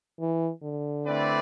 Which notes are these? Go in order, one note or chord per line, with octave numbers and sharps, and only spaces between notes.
E3
D3
A3 C4 E4 B4 D5